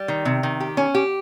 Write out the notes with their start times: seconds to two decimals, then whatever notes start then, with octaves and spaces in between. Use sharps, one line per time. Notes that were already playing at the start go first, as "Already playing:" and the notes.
Already playing: G3
0.08 D#3
0.25 C3
0.43 D#3
0.60 G4
0.77 C#4
0.95 G4